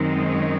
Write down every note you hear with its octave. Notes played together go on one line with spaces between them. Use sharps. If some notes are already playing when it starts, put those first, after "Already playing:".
Already playing: F#2 D#3 G#3 C4 D#4
C#5